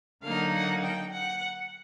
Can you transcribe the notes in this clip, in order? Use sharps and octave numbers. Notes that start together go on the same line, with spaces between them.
D3 F#3 A#3 D#4 F5
F#5
G5
F#5